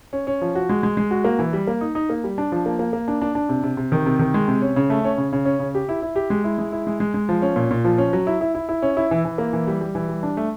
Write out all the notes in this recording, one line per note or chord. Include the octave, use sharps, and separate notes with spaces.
C#4
C#4
F3
F#4
G#3
G#3
G#3
F#4
A#3
E3
G3
A#3
D#4
D#4
A#3
G3
D4
F3
A#3
A#3
A#3
D4
D4
D4
C3
C3
C3
D#3
C3
D#3
G#3
C3
C#4
C#3
A3
C#4
C#3
C#3
C#4
C#3
G4
E4
E4
G4
G#3
E4
G#3
E4
G#3
G#3
G#3
F3
C#4
A#2
A#2
F3
C#4
F#3
E4
E4
E4
E4
C#4
E4
E3
E3
A#3
E3
G3
G3
E3
G3
D4
A3